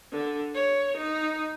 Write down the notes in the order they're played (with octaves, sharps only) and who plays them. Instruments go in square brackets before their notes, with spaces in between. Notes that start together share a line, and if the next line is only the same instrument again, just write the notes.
[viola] D3
C#5
D#4